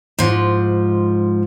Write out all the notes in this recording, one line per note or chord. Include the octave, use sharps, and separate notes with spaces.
G#2 F3